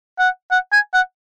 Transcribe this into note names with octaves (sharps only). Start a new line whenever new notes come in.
F#5
F#5
G#5
F#5